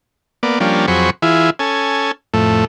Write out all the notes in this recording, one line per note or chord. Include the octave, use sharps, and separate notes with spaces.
A#3 B3 D5
F3 G3 A#3 C#4 D4
F2 F#3 C4 G#4 B5 C#6
E3 E4 F4 G#4
C#4 A4 G#5
F2 A2 A3